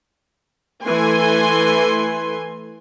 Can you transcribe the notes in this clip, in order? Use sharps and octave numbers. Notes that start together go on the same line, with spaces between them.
E3 A3 G#5 C6